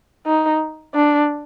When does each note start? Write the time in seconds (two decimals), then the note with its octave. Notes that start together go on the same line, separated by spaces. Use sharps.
0.26 D#4
0.94 D4